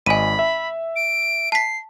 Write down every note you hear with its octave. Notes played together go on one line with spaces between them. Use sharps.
G#1 D#5 G#5 B5 D#7
E5
D7
A5 B6 C7